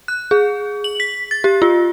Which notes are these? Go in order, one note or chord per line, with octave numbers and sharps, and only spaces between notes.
F#6
G#4
F#7
B6
A6
G4
F4